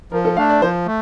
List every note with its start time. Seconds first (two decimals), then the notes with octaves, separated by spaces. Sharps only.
0.12 F3 A#4
0.25 A4
0.37 A3 D4 F5
0.50 D5
0.62 F3 C5
0.86 A3